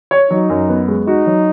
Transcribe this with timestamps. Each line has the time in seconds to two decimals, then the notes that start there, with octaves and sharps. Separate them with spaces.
0.11 C#5
0.31 F#3 D#4
0.49 F#2
0.69 B3
0.88 G#3
1.07 D#4 F#4
1.27 F#3